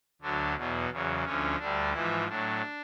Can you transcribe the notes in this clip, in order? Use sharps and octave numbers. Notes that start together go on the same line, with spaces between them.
D2 D3 F#3 D4
E2 B2 F#3
E2 C#3 F#3
D2 D3 F3 C#4
D2 D3 G3 D4
G#2 E3 F3 E4
A2 F#3 D4